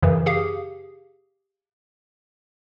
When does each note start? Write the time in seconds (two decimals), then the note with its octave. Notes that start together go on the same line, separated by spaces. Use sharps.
0.03 F#2 C#3 E3
0.26 G4 G#4 F5